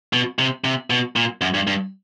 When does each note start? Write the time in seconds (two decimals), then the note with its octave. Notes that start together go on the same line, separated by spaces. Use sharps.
0.13 B2
0.39 C3
0.64 C3
0.90 B2
1.16 A#2
1.41 F#2
1.54 G2
1.67 G2